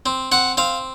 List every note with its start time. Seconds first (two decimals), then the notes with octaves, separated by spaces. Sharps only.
0.06 C4
0.32 C4 F#5
0.57 C4 F5